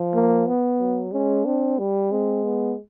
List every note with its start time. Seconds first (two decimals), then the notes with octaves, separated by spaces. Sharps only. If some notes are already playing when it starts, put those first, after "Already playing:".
Already playing: F3
0.14 A#3
0.47 B3
0.80 F#3
1.12 G#3 C#4
1.45 C4 D4
1.79 G3
2.11 G#3 C4
2.44 B3